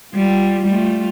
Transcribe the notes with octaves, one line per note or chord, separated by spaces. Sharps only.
G3 F4
G3 A3 F4